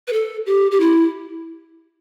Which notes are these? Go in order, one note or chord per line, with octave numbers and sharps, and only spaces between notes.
B4
A4
G4
G4
E4